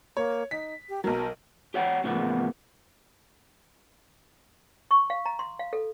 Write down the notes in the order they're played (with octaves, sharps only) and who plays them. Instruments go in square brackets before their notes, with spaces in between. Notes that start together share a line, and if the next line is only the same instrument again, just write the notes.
[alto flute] A#3 [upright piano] C#5
[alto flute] D#4 [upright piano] B6
[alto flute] G4
[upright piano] B1 F#3 [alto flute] A#4
[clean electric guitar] G4 C#5 F#5 G5
A2 C#3 F3 A#3 B3
[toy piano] C#6
F5
A#5
C6
F5
A4